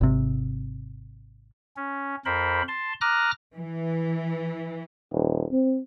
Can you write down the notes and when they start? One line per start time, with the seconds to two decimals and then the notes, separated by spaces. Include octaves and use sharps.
0.01 G#1 C3
1.76 C#4
2.25 F2 A#4 C5 B5
2.68 A5 C6
3.01 A#5 D6 D#6 F6 F#6 A#6
3.55 E3
5.12 D#1
5.52 C4